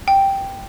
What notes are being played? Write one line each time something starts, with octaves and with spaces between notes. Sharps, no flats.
G5